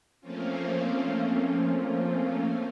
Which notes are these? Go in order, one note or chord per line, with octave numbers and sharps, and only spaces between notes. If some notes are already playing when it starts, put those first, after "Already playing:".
F3 A3 A#3 C4 C#4 F4